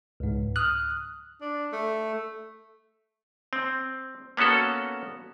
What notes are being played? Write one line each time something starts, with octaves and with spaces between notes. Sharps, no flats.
C#2 G#2
D#6 F6 F#6
D4
A3
C4
A#3 B3 C#4 F#4 A4